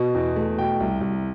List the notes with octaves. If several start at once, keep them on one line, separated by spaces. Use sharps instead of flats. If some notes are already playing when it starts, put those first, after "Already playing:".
Already playing: B2
E2
A3
B2 G5
C2
C2